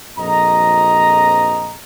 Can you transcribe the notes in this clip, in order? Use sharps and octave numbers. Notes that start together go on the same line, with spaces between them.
A#1 F2 D#5 A#5